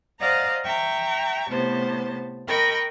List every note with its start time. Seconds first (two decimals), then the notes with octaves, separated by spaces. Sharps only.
0.19 C5 D5 D#5 F5 F#5 A#5
0.64 E5 G5 A#5 C#6
1.49 A2 C3 B3 C5 A5
2.47 A#4 D#5 G5 B5 C#6